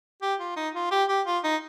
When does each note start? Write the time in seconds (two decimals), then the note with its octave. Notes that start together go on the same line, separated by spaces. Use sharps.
0.22 G4
0.40 F4
0.56 D#4
0.74 F4
0.91 G4
1.09 G4
1.26 F4
1.44 D#4